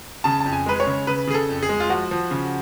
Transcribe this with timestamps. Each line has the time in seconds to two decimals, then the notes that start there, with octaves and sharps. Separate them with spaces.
0.24 C#3 A5
0.40 A5
0.46 F2
0.52 G#5
0.66 G#3 B4
0.80 C#5
0.87 C#3
1.07 C#3 B4
1.27 C#3 G#4
1.34 A4
1.49 F2
1.63 G#4
1.69 G#3
1.80 F4
1.89 F3 F#4
2.11 F3
2.31 C#3